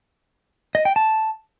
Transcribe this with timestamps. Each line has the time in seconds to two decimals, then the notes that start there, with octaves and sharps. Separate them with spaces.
0.75 D#5
0.85 G5
0.96 A5